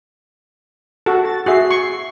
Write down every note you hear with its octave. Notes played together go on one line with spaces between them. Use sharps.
F#4 A4
A6
F#4 G#4 E5 C7
C#6